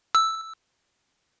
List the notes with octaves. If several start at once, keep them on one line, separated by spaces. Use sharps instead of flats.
E6